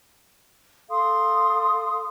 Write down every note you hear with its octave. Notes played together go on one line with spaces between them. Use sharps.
A4 F5 C6 D#6